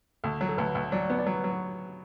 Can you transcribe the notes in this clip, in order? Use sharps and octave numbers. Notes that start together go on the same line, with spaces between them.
D2 A4
F#3
A4
D2 B4
D2
F#3 D5
B3
D5
F#3 B4
F#3